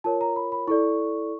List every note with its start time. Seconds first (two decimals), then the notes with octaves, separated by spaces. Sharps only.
0.04 F4 A#4 C#5 A5
0.21 A#5
0.36 B5
0.52 B5
0.67 E4 A4 D5 C#6